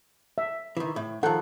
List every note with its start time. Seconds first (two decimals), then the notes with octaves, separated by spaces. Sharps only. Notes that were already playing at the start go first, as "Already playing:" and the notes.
0.38 E5
0.77 D#3 E3
0.96 A2
1.23 D#3 F3 A4 F#5